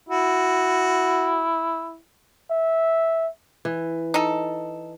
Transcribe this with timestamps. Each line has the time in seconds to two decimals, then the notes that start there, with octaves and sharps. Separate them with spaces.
0.09 E4 F#4
2.51 E5
3.65 E3
4.14 D#4 A4